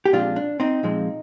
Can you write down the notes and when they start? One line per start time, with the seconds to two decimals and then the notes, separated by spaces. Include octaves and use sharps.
0.05 G4
0.13 A#2 F3 G#3 C4 D4 F4
0.36 D4
0.60 C4 D#4
0.83 A#2 F3 G#3 C4